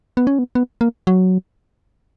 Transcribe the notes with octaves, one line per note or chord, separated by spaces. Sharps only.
B3
C#4
B3
B3
A#3
F#3